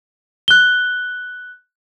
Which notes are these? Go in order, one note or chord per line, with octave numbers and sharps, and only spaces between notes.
F#6 G7